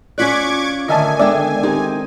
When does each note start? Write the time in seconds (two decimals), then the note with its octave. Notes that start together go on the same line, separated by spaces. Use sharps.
0.18 C#4 F4 D5 C#6 D6 F#6 G#6 B6
0.88 A2 D3 D#3 D#5 E5 G#5 A5
1.19 G#3 B3 D4 A4 D5 E5 G5
1.63 D#3 C4 D#4 G4